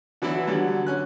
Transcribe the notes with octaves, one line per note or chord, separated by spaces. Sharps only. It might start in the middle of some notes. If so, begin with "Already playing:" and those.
D3 E3 F#3 B3 E4
D3 F#3 G3
C#4 F#6